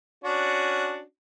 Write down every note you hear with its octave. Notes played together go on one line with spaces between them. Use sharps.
C#4 D4 F#4